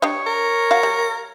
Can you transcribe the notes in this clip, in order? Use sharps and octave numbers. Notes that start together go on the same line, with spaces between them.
D4 G4 C#5 D#5
A#4
F#4 F5
G3